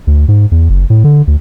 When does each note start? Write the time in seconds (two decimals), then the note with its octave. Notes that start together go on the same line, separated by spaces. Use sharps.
0.07 D2
0.28 G#2
0.52 E2
0.70 F#1
0.90 A2
1.04 D3
1.27 D2